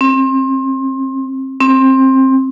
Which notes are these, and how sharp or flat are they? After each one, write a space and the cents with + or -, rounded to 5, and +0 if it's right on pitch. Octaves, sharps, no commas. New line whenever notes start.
C4 +30
C4 +20